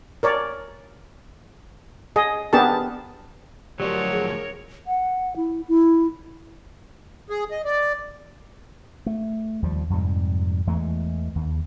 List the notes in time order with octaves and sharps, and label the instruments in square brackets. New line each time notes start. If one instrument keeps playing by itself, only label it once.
[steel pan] A#4 C#5 D5
G#4 D#5
B3 D4 G4 G#4 A#4 A5
[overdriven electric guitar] D2 F3 [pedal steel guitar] F#3 [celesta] G4 D5 [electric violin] A#4 C#5
[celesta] G#4
[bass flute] F#5
E4
E4
[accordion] G#4
D#5
D5
[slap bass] A3
D#2 F3 G3
F2 G#2 C3 G3
E2 E3 G#3 A3
D#2